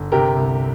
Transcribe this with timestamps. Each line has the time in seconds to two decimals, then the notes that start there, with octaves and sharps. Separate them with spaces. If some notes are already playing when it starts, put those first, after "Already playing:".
Already playing: G1
0.12 C3 G4 A#4
0.36 C2